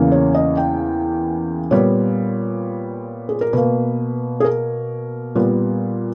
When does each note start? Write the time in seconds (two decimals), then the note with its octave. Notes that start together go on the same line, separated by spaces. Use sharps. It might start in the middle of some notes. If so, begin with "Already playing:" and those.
Already playing: E2 C#3 E3 A#3
0.12 C#5
0.34 D#5
0.57 G5
1.71 A#2 G3 B3 C#5
3.29 G#4
3.41 A#4
3.53 B2 A#3 B4
4.40 G#4
4.44 A#4
5.35 A#2 G3 B3